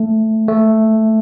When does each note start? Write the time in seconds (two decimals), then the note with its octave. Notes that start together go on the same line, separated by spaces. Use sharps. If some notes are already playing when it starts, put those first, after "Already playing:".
Already playing: A3
0.48 A3